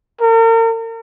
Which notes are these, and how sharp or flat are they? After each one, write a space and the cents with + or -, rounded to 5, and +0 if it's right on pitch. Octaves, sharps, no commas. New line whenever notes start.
A#4 -40